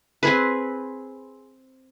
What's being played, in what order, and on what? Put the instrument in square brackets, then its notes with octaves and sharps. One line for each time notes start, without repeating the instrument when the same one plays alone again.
[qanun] C4 G#4 B4